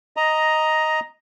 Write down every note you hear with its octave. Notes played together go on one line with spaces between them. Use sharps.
D#5 A#5